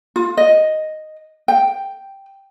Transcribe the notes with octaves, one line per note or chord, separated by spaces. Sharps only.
F4
D#5
G5